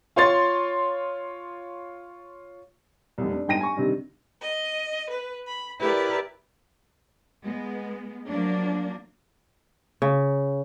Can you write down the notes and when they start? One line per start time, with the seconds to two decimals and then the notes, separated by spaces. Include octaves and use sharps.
0.16 F4 C#5 C6 A6
3.18 F1 C2
3.30 D4
3.48 G1 G#2 G5 A#6 D#7
3.61 G#5 C#6
3.76 G2 C3 D#3
4.41 D#5
5.10 B4
5.44 B5
5.80 E4 G4 A#4 B4 D5
7.42 G#3 B3
8.27 F3 F#3 A#3 D4
10.02 C#3